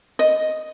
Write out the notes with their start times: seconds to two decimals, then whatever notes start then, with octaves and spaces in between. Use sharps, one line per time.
0.19 D#5